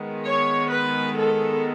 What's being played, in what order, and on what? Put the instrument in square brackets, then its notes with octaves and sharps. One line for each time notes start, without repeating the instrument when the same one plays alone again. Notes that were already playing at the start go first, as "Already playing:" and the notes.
Already playing: [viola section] D#3 G#3 B3
C#5
B4
A4